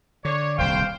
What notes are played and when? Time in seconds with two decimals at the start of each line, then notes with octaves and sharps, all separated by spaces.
0.25 D3 C#5 D5
0.58 D#1 C2 C5 F5 G5